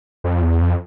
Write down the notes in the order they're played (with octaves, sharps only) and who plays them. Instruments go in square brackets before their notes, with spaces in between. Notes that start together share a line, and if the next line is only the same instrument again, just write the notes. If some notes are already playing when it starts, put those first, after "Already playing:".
[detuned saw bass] F2
E2
F2